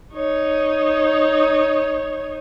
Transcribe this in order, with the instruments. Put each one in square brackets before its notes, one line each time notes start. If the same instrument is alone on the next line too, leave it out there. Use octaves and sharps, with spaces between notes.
[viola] D#4 C#5